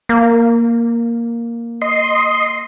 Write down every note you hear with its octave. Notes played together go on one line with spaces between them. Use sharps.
A#3
D#5 C6